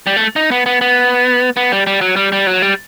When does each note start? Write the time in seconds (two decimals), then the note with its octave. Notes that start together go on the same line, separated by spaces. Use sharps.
0.07 G3
0.17 A3
0.36 D#4
0.51 B3
0.66 B3
0.81 B3
1.57 B3
1.72 G3
1.87 G3
2.01 F#3
2.16 G3
2.32 G3
2.47 F#3
2.62 G3